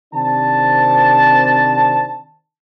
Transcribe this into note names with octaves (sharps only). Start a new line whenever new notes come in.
C3 D#3 C4 D4 A5